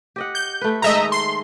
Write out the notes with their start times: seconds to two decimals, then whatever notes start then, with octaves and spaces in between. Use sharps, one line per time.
0.16 G4 D#5 F#5
0.35 G6
0.61 A3 B4
0.82 D#3 G#3 A3 D#5 E5 A#5
1.12 C6